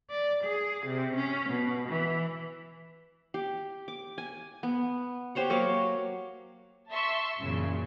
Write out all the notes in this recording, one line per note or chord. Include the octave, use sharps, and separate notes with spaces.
D5
G#4
C3
C#4
B2
E3
G4
D6
G#5
B3
G4 C5 C#5 F#5
F#3 A#3 C#5 D6
E5 A5 C6 C#6 E6
F#2 A#2 C#3 E3